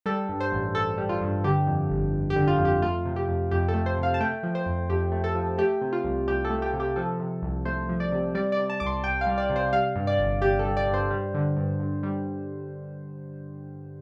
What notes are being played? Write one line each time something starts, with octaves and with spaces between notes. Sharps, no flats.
G3 A4
G2
C5
A1
A1 A4
G3
F4
G2
D3 G4
F2
G1
G1
G4
D3
F4
F2
G4
A3 F4
C3
G4
F2
F2 G4
A4
A3
C5
C3
F5
A5
A3 G5
F3
C5
F2
F2 G4
A3
A4
F3
A3 G4
C3
F4
C2
C2 G4
A4
A3
G4
C3
G4
F3 A4
C3
C2
A3 C5
F3
D5
C3
G3 D5
D5
C3
A5
C2 D6
C6
C2 G5
F5
G3
D5
C3
C5
G3 F5
G2
D5
G1
G1 G4
A4
G3
D5
G2
C5
G3
D3
G2
G2
G3